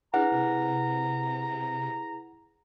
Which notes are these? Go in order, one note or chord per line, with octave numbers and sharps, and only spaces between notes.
D4 E4 G#4 B4 F#5 A#5
C3